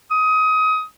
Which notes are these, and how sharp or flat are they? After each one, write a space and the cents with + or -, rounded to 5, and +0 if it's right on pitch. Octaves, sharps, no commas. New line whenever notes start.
D#6 +25